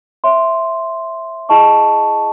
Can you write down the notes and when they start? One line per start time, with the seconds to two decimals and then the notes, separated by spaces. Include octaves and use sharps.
0.24 C#5 E5 C6
1.49 E4 G#4 D#5 A5 C#6